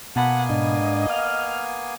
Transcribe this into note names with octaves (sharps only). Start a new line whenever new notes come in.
B2 A#3 B3 F#5 G#5 A5 B5
G#2 D4 D#5
F5 F6